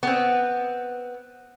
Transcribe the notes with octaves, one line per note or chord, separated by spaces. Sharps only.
B3 C4